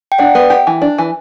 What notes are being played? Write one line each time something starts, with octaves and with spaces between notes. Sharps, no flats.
G5
D4 D5 F#5
B3
G4
E3
D4
E3